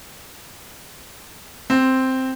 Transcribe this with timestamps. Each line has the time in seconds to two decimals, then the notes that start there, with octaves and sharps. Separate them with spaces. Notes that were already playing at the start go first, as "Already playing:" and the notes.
1.70 C4